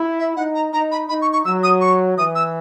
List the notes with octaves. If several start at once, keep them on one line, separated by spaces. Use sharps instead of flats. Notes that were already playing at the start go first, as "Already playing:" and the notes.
Already playing: E4
E5
D#4 F#5
A#5
D#4 A#5
B5
D#4 B5
C#6
C#6
F#3 E6
D#6
C#6
E3 D#6
E6